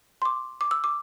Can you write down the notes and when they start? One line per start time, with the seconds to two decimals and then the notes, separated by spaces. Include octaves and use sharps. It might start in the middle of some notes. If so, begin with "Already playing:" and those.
0.22 C6
0.25 D6
0.61 D6
0.71 E6
0.84 D6